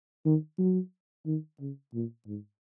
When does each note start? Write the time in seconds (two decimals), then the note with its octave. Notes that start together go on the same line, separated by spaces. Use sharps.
0.25 D#3
0.58 F#3
1.26 D#3
1.60 C#3
1.94 A#2
2.27 G#2